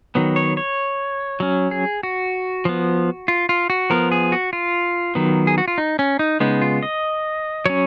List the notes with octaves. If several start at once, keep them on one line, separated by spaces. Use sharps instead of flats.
D#3 F#3 B3
C#5
C#5
F#3 C#4
G#4
F#4
F3 B3
F4
F4
F#4
F3 B3 A#4
G#4
F#4
F4
D#3 F#3 B3
G#4
F#4
F4
D#4
C#4
D#4
C#3 G#3 B3 D#4
F4
D#5
F#3 C#4 C#5